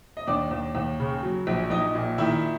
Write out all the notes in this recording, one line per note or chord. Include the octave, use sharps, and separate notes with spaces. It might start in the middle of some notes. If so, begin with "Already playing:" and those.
D#5
D#2 D4 D5
D#2
D#2
C#3
F#3
A#1
A#1 D#4 D#5
A#2
D#3 E4 E5